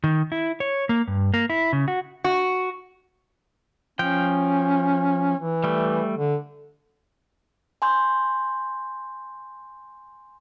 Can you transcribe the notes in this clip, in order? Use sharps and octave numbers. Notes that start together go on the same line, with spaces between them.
D#3
E4
C#5
A#3
G2
A#3
E4
C#3
F#4
F#4
F3 C#4 G5
E3
G3 A3
D3
G#5 C6 G6